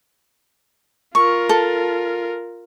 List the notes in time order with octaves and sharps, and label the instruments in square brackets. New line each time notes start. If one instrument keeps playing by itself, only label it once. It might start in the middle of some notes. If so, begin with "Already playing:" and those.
[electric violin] F4 A#4 [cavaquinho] C#6
[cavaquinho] A4